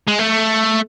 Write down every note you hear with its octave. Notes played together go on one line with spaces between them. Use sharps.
G#3
A3